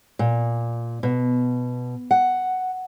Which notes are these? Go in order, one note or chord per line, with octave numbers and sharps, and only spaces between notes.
A#2
B2
F#5